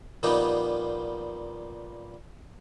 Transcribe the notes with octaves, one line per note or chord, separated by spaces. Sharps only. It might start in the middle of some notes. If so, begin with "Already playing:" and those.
A#2 F3 G3 A#3 B3 D#4